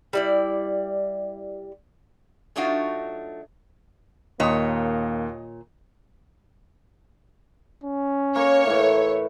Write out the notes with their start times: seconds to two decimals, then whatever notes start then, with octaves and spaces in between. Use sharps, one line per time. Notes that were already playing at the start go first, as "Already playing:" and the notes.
0.13 G3 E4 D5
2.56 F#3 A3 D4 D#4 F4 F#4
4.40 D#2 A#2 A#3 C#5 D#5 D#6
7.84 C#4
8.36 A#3 C#5
8.66 A2 E3 E5